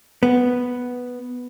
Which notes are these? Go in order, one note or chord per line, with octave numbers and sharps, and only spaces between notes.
B3